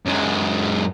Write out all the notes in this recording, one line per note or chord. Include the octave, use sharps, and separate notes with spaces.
F#2 G#3